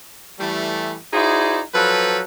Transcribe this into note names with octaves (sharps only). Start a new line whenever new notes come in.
E3 G3 A3
D#4 E4 F#4 G#4 C5 D5
F3 F#3 A4 B4